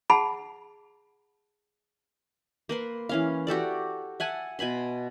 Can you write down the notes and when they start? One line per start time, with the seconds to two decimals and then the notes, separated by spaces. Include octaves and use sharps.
0.10 G#4 F#5 A5 B5
2.69 A#3 B4 C6
3.09 E3 C#4 F5
3.47 F#4 G4 A4 D5
4.20 E5 F#5 G#5 A5
4.59 B2 G#5 B5 C6